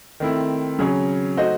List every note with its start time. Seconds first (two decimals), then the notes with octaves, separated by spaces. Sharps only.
0.20 D#3 A3 C4 E4
0.79 C#3 F#3 C#4 G#4 C#5
1.37 A3 D#4 F#4 C5 D#5